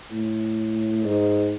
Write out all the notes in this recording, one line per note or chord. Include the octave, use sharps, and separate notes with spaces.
A2
G#2